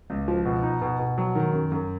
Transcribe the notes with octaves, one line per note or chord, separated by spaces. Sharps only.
C#2
F3
B2
D#4
B2
B2
F#3
D#3
F#2
F#2